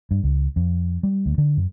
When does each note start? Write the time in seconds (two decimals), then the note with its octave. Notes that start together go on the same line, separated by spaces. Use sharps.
0.11 G2
0.23 C#2
0.56 F2
1.03 G3
1.26 D2
1.38 D3
1.57 F#2